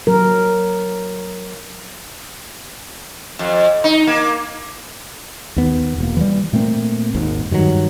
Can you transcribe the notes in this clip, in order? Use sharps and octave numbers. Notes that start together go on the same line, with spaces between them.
F#3 A#4
F2
D#4
A#3
D#2 B3
E1 A#3
E3 F3 G3
A#2 A3 A#3 C4
G#1 D#2 G#2
G2 D#3 F3 F#3